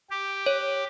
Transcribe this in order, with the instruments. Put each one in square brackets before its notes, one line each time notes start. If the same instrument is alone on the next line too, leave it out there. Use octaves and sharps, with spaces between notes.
[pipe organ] G4
[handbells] C#5